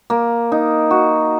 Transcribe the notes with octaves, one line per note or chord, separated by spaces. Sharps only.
A#3
D#4
F#4